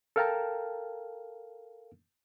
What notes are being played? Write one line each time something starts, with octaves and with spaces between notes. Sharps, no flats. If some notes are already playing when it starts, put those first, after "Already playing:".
A4 A#4 F5 G5 A5 A#5